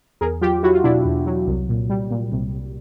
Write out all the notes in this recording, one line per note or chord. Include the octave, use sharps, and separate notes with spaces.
E2 G#4 A#4
F#3 F4 G4
F#3 E4 F#4
F4
B2 D4 E4
E2
F#3
C2
A#2
G3
A#2
C2
C2